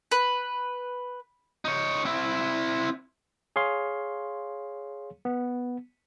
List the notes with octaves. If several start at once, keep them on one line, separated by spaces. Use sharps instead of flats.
B4
D#4 C#5
C4 E4
G#4 C#5 F5 C6
B3